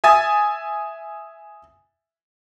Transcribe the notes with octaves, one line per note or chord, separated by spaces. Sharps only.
E5 G#5 D#6 A6